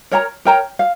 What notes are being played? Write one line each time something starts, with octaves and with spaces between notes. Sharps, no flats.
A#4 C#5 G5 A#5
A#4 C#5 G5 A#5
F5